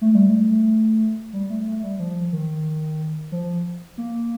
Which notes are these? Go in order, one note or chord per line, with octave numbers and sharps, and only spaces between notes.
A3
G3
A3
G3
A3
A3
G3
F3
D#3
F3
A#3